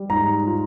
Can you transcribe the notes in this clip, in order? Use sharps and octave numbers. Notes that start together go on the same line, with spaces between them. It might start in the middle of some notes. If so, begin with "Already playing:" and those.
Already playing: G3
G#2 A#5
F4